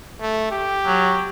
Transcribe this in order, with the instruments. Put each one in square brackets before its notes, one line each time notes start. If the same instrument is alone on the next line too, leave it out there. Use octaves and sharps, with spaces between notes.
[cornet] A3
G4
[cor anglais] F#3